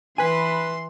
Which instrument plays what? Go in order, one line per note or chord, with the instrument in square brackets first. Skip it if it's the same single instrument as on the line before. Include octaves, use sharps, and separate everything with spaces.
[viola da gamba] E3 [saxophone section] B4 [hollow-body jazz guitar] G#5 [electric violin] C6